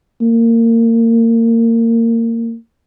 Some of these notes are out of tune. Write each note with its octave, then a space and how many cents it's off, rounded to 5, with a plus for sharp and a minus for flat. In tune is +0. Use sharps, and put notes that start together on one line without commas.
A#3 -25